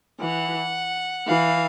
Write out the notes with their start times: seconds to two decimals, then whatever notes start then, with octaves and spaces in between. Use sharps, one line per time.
0.20 E3 F#5
1.28 E3 F5